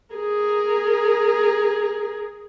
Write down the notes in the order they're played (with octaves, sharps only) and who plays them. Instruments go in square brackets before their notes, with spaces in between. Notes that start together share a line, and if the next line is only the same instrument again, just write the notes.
[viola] G#4 A#4